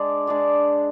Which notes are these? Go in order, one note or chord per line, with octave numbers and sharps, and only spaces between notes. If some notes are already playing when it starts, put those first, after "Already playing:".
Already playing: G#3 D4 G#4 D5
G#3 D4 G#4 D5